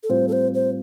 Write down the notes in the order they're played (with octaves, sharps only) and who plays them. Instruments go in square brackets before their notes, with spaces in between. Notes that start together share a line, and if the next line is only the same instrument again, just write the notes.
[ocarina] A4
[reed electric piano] A2 G3 C4 F4 [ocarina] C5
[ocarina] A4
C5
C5